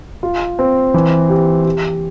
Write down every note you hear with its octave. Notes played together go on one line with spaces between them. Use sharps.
F4
C4
E3
G4
G4